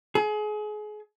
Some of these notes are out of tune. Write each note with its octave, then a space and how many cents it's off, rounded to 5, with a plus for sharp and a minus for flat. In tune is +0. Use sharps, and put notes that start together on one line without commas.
G#4 +30